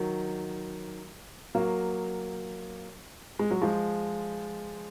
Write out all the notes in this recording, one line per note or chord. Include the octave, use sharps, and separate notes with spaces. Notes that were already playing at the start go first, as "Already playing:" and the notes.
Already playing: D#3 F#3
F#3 A#3
G#3
F#3
F3 G#3